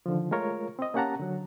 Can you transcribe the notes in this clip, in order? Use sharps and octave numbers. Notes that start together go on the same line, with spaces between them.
D3 D#3 F3
G#3 A3 F4 A#4 C#5
C4 D#5
A#3 C#4 G4 F#5 A5 A#5
D3 F#3